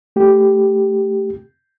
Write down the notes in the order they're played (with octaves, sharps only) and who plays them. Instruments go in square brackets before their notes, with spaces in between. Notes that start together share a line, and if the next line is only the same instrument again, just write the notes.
[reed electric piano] A3 G4